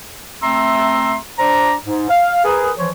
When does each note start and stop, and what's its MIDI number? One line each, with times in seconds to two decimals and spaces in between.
0.42 1.17 57
0.42 1.17 60
0.42 1.17 76
0.42 1.17 82
0.42 1.17 84
0.42 1.17 88
1.39 1.74 62
1.39 1.74 72
1.39 1.74 74
1.39 1.74 82
1.85 2.08 44
2.10 2.44 77
2.45 2.71 68
2.45 2.71 70
2.45 2.71 71
2.78 2.91 52
2.78 2.91 53
2.78 2.91 72
2.78 2.91 73